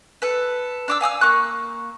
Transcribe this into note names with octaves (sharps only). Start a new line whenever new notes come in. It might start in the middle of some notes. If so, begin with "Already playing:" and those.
A4 B4
D4 D6 E6
F5 G#5 D#6 E6
A#3 C#6 F#6